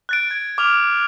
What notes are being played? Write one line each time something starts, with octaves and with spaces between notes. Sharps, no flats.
F#6 A6 D7
G#6
D6 F6 F7